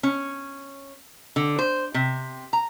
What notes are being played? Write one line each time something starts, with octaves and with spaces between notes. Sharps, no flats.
C#4
D3
C5
C3
A#5